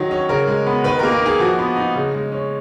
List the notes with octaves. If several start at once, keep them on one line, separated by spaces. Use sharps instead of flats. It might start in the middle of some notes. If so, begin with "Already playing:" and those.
Already playing: D#3 F#3
C#4
C#3 A#4
G#3
B3
D#3 B4
A#4
A#3
A#4
D#4 G#4
F3 F#4
B3
D#4
C#3
G#3
C#4